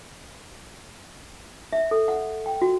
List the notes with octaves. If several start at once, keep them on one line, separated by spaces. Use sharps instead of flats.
E5
A4
F#5
G5
F#4